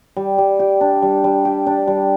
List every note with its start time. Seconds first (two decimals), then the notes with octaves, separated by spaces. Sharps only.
0.16 G3
0.38 G3
0.59 G4
0.81 D4
1.02 G3
1.24 G3
1.45 G4
1.66 D4
1.88 G3